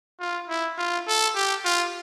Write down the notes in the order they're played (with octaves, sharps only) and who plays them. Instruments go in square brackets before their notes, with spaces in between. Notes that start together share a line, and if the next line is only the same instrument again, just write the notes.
[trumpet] F4
E4
F4
A4
G4
F4